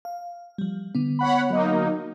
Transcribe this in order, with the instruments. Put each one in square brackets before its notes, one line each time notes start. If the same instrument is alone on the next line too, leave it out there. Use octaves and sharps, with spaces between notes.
[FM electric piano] F5
F3 G3
D3 B3
[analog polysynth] C#5 F#5 B5
F#3 A#3 D#4